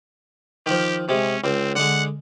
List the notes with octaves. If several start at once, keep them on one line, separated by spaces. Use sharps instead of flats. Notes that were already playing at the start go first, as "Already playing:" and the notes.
D#3 F3 G4
C3 G#3 C#4
C#2 C4
D3 G#3 F#5